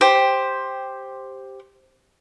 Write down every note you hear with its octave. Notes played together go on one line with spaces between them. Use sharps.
G4 C5